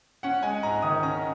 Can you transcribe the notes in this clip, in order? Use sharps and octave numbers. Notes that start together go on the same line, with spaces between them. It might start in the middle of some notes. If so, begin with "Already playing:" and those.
C#4 F#5
G#3 G#5
G#2 A#5
D#3 D#6
C#4 A#5